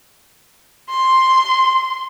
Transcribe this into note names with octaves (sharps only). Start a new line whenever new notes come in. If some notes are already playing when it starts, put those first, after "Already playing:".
C6